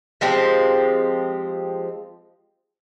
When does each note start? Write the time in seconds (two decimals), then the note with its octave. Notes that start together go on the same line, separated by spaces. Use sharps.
0.21 F3 G#3 C4 G4